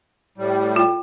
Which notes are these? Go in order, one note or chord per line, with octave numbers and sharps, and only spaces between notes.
A2 G3
F4 G5